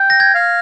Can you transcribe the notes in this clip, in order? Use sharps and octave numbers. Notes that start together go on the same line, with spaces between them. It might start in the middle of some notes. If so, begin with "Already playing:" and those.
Already playing: G5
A#6
G#6
F5